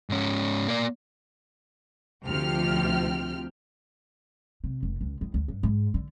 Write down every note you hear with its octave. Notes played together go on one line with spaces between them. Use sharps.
G#2 C#4
A#3 D5
D2 C3 F3 F4 G5 F6
C3
F1
C#2
E2
D2
G2
G#2
D3